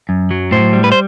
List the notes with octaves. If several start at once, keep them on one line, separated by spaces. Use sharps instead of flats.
F#2
F#3
A2 C5
G3
B4
C5